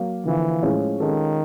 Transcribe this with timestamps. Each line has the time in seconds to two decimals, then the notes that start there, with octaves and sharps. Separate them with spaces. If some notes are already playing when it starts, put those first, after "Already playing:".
Already playing: F#3 A#3
0.25 D3 E3 F3 A#3
0.62 A2 F3 G#3 C#4
1.00 D#3 G#3 C#4 F4 A4